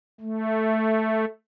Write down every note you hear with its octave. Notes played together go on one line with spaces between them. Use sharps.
A3